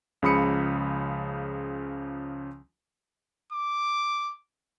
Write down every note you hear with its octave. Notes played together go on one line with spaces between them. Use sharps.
C#2 C#3 F3 B5 D#6 C#7
D6